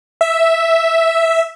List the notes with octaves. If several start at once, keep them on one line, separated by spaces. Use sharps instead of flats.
E5